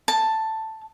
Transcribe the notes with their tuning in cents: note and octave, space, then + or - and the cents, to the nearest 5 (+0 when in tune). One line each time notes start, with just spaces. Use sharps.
A5 +5